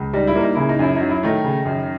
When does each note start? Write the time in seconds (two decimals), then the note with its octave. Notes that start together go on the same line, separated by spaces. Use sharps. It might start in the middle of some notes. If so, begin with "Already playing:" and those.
Already playing: C#2
0.13 G3 D#4
0.27 E4
0.35 A#3
0.41 D#4
0.55 C#3 E4
0.69 D#4
0.79 F#2 E4
0.96 F#3 D#4
1.10 E4
1.23 D#3 A3 D#4
1.44 C#3
1.65 F#2